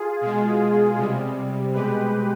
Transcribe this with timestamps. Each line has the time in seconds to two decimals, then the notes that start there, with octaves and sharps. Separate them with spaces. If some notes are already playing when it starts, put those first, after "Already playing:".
Already playing: F4 G#4
0.21 B2 G#3
0.97 C3 G3
1.74 B2 G#3 G4 B4